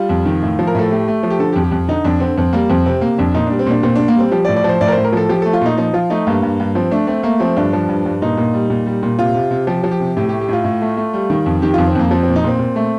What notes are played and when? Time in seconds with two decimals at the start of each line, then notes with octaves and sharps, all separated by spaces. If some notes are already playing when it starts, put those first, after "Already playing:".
Already playing: G3 F4
0.09 F2
0.25 D#3
0.42 A2
0.59 F3
0.67 A#4
0.75 A2 A4
0.91 A3 G4
1.08 A3
1.23 F3
1.30 G4
1.39 D3 A4
1.52 G4
1.56 F2
1.64 G4
1.72 F2
1.88 D3 D#4
2.04 F2 D4
2.20 D3 C4
2.38 F2 C4
2.53 G3 A#3
2.70 F2 C4
2.86 C3 C4
3.01 C3 A#3
3.18 F2 D4
3.34 A#2 D#4
3.47 G3 D4
3.59 C4
3.66 A#2 D4
3.83 A#2 C4
3.95 A#2 D4
4.08 A#3
4.15 G3 C4
4.31 F3 G4
4.45 D5
4.49 A2
4.56 D5
4.64 F3 C5
4.81 A2 D5
4.88 A#4
4.92 C5
4.97 A2
5.05 A#4
5.13 F3 A4
5.29 F3 G4
5.42 A3 A4
5.53 F4
5.61 A#2 D#4
5.77 F3 D#4
5.94 F3 F4
6.10 A3 D#4
6.27 G2 A#3
6.42 G2
6.60 G2
6.75 F3 C4
6.91 A3 D4
7.07 A3 C4
7.23 A3 A#3
7.40 F3 C4
7.56 G2 D4
7.73 F3
7.89 G2
8.05 G2
8.22 A#2 D#4
8.37 A#2
8.54 G3
8.70 A#2
8.86 G3
9.03 A#2
9.19 C3 F4
9.34 C3
9.51 C3
9.67 F3 G4
9.84 F3
9.91 G4
10.00 C3
10.17 A2 G4
10.29 G4
10.33 A3
10.41 G4
10.48 A2 F4
10.64 A2
10.82 A3
10.97 A3
11.14 G3
11.30 D#3
11.46 F2
11.62 D#3 G4
11.74 F2 F4
11.87 C4
11.95 F2 A#3
12.11 F3 C4
12.23 A#2 C4
12.36 D#4
12.44 A#2 C4
12.59 A#2
12.76 A3